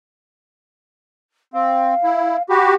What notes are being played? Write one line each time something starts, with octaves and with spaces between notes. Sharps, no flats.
C4 F5
E4
F#4 G4 B5